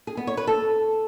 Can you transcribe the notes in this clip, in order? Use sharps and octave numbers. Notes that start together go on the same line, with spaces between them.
G#4
B3
C#5
B4
A4